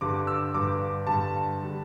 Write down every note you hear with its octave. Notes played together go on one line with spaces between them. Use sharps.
G1 G2 D3 G3 D6
E6
G1 G2 D3 G3 D6
G1 G2 D3 G3 A5
D3 G3